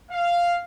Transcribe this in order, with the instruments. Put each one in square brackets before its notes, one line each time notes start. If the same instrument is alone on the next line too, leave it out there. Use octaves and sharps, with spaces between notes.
[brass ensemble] F5